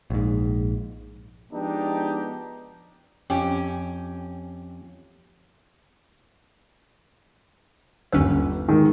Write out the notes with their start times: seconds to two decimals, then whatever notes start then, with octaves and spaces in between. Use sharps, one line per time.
0.10 A#1 G#2
1.52 F3 G#3 B3 D4 D#4 G4
3.30 F2 C#4 G4
8.12 G1 D#2 C#4 B4 E6
8.69 G#2 D#3